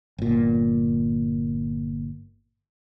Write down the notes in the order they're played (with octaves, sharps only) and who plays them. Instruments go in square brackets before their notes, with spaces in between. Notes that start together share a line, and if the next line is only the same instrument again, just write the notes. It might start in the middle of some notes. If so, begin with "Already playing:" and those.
[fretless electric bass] G1 A#2